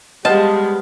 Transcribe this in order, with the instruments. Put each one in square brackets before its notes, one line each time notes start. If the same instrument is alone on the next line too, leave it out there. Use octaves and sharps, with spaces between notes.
[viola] G3 G#3 [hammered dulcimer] B3 C5 F5 [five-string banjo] D#5 [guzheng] A5